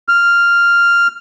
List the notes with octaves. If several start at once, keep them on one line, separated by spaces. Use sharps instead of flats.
F6